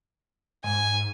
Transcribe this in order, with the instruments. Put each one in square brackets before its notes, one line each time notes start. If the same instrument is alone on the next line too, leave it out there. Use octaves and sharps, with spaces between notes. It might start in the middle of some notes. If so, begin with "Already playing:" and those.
[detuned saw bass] G#2 [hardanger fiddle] G#5